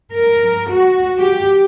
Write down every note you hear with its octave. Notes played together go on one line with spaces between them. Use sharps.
A#4
F#4
G4